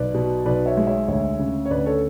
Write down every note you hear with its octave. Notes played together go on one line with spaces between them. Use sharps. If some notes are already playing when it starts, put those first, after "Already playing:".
Already playing: B1 B4 D5
B2
B1 B4 D5
C#5 E5
G#3
C#5 E5
D2 C#5 E5
C#3
C#5
D2 B4 D5
A4 C#5